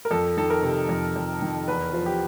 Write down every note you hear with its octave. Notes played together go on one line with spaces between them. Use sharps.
A#4
F2 A4
D#3 A4
A#4
C3
F2
F2
D#3
E2 B4
F3
G4